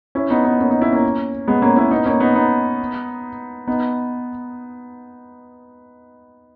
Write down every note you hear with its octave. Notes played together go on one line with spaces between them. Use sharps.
C#4 E4
B3 D#4
B3 D#4
A#3 C#4
B3 D#4
C#4 E4
A#3 C#4
G#3 B3
A#3 C#4
C#4 E4
B3 D#4
A#3 C#4
B3 D#4
B3 D#4
B3 D#4